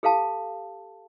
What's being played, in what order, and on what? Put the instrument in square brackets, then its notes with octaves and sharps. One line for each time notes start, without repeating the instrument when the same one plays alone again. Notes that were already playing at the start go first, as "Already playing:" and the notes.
[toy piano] G4 A4 F5 A5